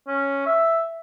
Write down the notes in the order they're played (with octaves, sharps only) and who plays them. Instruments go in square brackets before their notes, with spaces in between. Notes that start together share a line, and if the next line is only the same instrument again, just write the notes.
[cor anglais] C#4
E5